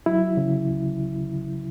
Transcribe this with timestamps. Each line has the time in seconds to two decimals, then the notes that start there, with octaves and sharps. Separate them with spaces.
0.06 F#3 E4
0.37 C#3
0.68 C#2